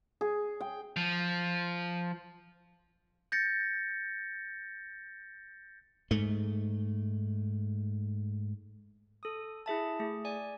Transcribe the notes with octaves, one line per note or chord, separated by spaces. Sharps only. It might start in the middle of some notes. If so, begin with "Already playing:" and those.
G#4
G5
F3
G6 A6 A#6 C#7
G#2 A3
A4 D#6
E4 G#4 E5 A5
A3 G#4
D5 G#5